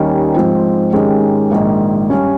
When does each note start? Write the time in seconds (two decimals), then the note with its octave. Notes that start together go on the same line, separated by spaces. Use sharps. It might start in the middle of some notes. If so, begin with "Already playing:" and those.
Already playing: D#2 D#3 G3 C#4
0.34 G#2 F3 C4
0.93 G#2 D#3 G#3 C#4 G4
1.51 A#1 G#2 D#3
2.10 G2 G3 C#4